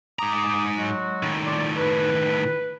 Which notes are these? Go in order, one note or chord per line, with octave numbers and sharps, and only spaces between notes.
G#2 A#5 D6 D#6
F#3 G#3 F#4
A2 D#3
F4 D5
B4